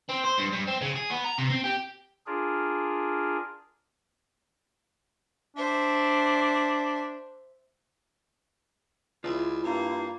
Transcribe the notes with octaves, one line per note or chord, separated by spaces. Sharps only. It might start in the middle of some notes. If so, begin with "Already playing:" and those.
C4
C5
G2
G2
C4
C#3
G#4
B3
A#5
C3
C4
G4
D4 F4 G#4 A#4
D4 C5 E5
C#2 E4 F4 D5
G2 A#3